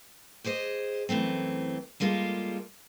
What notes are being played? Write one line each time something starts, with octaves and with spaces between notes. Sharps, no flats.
G4 G#4 C5 D#5
F#2 E3 A3 C4
G3 G#3 A#3 F4 A4